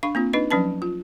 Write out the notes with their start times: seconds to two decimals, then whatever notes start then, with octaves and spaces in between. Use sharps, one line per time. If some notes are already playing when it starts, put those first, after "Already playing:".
0.03 D4 F5 C#6
0.15 A#3 C4 F4
0.33 D4 D#4 B4 D#5
0.50 F3 F#3 C#4 B4 A5
0.82 F4